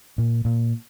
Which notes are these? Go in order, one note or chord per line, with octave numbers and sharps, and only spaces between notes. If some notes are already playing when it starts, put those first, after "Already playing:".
A#2
A#2